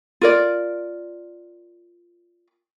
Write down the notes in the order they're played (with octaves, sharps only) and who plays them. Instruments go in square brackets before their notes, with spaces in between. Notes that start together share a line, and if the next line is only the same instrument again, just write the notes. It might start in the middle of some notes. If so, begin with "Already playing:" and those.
[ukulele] F4 A#4 D5